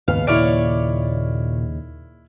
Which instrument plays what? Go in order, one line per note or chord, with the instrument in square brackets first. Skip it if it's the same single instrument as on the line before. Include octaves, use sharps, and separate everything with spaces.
[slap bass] D#2 C#3 [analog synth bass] G#2 [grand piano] B3 [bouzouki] F5
[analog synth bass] A#2 [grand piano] E4 F6 D7 [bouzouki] C#5 D5